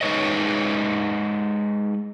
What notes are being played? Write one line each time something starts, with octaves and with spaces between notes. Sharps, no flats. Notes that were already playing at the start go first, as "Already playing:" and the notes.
G#3 D#4 B4 C#5 D#5